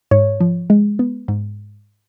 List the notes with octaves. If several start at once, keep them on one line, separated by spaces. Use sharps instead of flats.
G#2 C#5
F3
G#3
B3
G#2